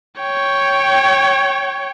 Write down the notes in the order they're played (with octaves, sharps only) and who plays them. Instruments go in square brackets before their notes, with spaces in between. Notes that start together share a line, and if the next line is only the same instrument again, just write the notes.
[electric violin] C#5 G5